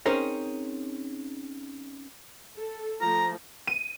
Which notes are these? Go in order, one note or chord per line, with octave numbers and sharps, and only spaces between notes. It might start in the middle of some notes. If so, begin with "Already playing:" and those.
C4 C#4 D#4 G#4 A#4 C#5
A4
F3 A3 A#5
D#7